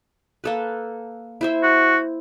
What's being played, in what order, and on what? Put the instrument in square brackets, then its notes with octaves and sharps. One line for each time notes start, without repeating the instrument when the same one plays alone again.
[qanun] A#3 A4 B4
E4 C5 E5
[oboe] F#4